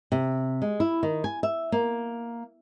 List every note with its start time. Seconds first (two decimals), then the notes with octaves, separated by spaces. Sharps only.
0.12 C3
0.62 G#3
0.80 E4
1.03 D#3
1.24 G#5
1.43 E5
1.72 A#3